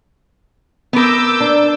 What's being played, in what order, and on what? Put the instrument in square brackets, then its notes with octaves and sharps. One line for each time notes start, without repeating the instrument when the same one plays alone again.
[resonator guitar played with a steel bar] B3 A#4 [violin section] D6 E6 G6
[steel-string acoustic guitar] D4